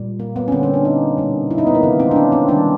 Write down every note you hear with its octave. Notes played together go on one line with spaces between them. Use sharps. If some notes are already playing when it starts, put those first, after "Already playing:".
Already playing: A#2 G3
A#3
B3
C#4
D3 G3 A#3 C4
C#4
D4
D#4
B2 G3 A#3
E4
D#4
B3
A#3
C3 D#3 G#3 B3
C4
D4
C#4
C4
D#3 G3 A#3 D4